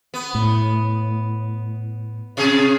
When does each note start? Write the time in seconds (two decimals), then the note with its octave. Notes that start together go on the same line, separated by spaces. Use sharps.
0.14 B3
0.35 A2
2.37 C3 C#4 G#4